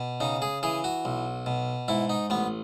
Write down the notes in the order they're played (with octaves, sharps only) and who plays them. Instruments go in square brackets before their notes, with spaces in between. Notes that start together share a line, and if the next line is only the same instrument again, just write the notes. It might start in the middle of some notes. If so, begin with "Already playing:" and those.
Already playing: [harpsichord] B2
C#3 D#4
G#4
E3 G#4
F#4
B1
B2
G#2 E4
D#4
A1 B3